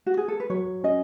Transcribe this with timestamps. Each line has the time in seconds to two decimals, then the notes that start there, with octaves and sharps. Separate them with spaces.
0.06 F#4
0.17 G#4
0.28 A4
0.40 B4
0.50 F#3 C#5
0.84 C#4 D#5